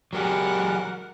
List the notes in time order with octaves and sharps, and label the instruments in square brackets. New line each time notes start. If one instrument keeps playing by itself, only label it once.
[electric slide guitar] F#3 G4 G#4 [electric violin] A#4 F#5